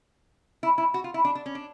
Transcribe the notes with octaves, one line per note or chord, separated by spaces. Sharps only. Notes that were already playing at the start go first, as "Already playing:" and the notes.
E4
E4
F#4
F4
E4
D4
D4
C#4
D4